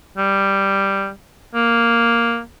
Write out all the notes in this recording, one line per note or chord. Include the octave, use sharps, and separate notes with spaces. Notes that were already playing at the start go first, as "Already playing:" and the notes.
G3
A#3